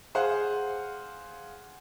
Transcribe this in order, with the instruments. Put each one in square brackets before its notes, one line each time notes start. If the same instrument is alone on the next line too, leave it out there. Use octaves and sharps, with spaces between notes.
[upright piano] G#4 C5 F5 F#5